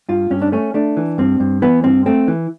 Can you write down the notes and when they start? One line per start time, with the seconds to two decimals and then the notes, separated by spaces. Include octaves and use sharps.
0.09 G2 F4
0.30 G2 C#4
0.42 D4
0.52 A3 C#4
0.74 A3 D4
0.97 E3
1.18 G2 C4
1.40 G2
1.62 E3 B3
1.84 G2 C4
2.06 A3 C4
2.28 E3